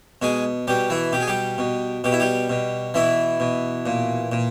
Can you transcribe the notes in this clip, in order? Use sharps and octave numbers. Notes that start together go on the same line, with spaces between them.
B2 G#3 G#4
B2 G3 G4
E3 E4
B2 G4
G#4
G3 G4
B2
B2 G4
E4
G3 G4
B2
B2 E3 E4
B2
A#2
A#2